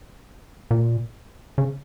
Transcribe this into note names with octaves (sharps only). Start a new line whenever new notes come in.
A#2
C#3